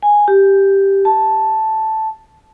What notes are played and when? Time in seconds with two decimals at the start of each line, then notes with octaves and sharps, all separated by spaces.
0.03 G#5
0.28 G4
1.05 A5